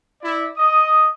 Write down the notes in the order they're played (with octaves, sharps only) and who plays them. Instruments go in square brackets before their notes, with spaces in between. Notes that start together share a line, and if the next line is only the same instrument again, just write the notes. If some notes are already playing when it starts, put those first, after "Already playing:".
[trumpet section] E4 D5
D#5 D#6